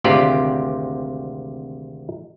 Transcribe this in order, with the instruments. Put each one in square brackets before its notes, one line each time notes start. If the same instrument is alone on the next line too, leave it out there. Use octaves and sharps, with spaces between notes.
[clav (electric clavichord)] G#1 D2 C3 F4 G4 D5